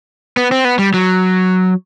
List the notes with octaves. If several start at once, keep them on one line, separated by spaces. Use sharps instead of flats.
B3
C4
B3
G3
F#3